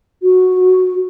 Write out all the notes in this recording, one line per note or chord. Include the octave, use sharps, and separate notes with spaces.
F#4